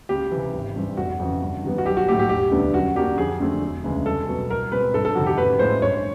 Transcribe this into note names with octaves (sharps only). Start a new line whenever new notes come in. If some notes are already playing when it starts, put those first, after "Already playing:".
C#2 G4
C3 E3
G#1
G2 E3 G3 C4
F1 F#4
F2 C#3 E3
G2
D#3 G3 B3
F#4
B1 G4
F#4
A2 F#3 A3 G4
G4
E1 G4
D2 D3 G3 B3
F#2 F#4
D3 F#3 A#3 D4 G4
F2 G#4
D3 F#3 A3 C4
E1
D2 C#3 E3 G#3
C2 A4
B2 F#3 B3
C2 A#4
B2 G#3 C4 B4
G1 A4
A4
F2 C3 D#3 F#4
G4
A1 B4
A2 F3 G#3 C5
G1 C#5